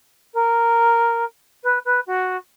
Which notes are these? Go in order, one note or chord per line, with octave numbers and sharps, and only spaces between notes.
A#4
B4
B4
F#4